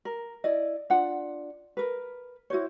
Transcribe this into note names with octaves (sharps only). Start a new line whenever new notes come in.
A#4
E4 D5 D#5
D4 F4 F#5
A#4 B4
E4 F#4 C5 C#5